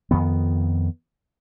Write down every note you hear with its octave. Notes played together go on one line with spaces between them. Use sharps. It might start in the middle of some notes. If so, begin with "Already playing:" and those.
F2 D#3 B3